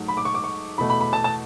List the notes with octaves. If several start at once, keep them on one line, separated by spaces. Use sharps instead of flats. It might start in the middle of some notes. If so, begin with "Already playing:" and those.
Already playing: G#2 F#3 A3
B5
D6
C#6
D6
C#6
E2 B2 A3 B5
B5
B5
A5
A5